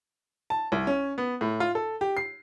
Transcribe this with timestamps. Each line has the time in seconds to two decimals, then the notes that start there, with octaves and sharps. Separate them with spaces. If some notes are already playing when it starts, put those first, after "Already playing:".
0.50 A5
0.72 C2
0.87 C#4
1.18 B3
1.41 A2
1.60 F4
1.75 A4
2.01 G4
2.17 C7